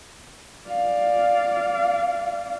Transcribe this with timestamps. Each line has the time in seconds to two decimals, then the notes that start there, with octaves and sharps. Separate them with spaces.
0.68 D5 F5